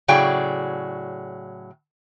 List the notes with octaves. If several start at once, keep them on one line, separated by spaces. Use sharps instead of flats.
A2 C#3 F#3 G#4 D5 G5